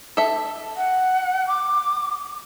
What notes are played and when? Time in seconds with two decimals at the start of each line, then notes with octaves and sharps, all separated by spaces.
0.17 A4 E5
0.77 F#5
1.48 D6